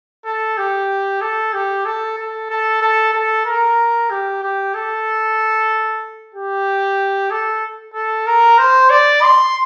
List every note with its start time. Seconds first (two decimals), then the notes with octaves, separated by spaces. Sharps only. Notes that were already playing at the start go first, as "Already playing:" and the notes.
0.25 A4
0.58 G4
1.21 A4
1.53 G4
1.85 A4
2.18 A4
2.50 A4
2.81 A4
3.13 A4
3.46 A#4
4.10 G4
4.42 G4
4.74 A4
6.34 G4
7.31 A4
7.94 A4
8.27 A#4
8.58 C5
8.90 D5
9.22 C6